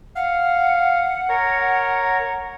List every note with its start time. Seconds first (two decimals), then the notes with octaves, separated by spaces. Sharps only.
0.16 F5 F#5
1.29 A#4 C#5